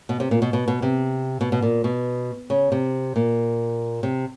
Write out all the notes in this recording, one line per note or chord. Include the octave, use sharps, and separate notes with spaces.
B2
C3
A#2
B2
B2
B2
C3
B2
B2
A#2
B2
C#3
C3
A#2
C3